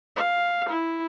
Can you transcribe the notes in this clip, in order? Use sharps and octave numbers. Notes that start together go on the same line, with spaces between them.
F5
E4